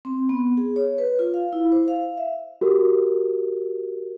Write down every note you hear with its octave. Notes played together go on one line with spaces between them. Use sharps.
C4
B3
G#4
C#5
B4
F4
F5
E4
C5
F5
E5
F#4 G4 A#4